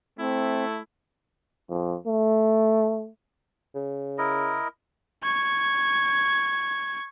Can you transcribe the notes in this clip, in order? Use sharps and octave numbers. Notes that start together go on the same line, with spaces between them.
A3 C4 E4
F2
A3
C#3
E4 A#4 D#5
C#6 G#6